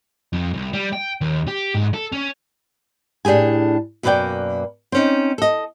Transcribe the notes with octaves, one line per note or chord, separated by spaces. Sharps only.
F2
C2
G3
G5
D#2
G4
G#2
A4
C#4
A2 D4 G4 G#4 G#5
F#2 B2 A#3 B4 D5 G5
C4 C#4 D#4
A4 D#5